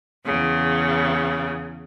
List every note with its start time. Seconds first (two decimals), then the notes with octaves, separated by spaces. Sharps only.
0.24 E2 C#3